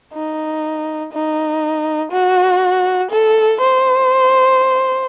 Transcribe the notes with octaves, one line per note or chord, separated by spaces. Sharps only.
D#4
D#4
F#4
A4
C5